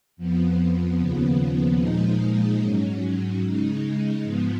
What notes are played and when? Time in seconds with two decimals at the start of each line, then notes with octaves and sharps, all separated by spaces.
0.17 F2 F3 B3
0.98 D#2 C#3 F3 B3
1.79 A#2 F3 G#3 D#4
2.60 G#2 F#3 C#4
3.42 C#3 G#3 D#4
4.23 G#2 F3 B3